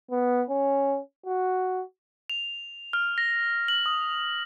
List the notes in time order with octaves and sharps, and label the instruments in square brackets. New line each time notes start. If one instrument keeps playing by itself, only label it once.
[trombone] B3
C#4
F#4
[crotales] F7
F6
A#6
F#7
D#6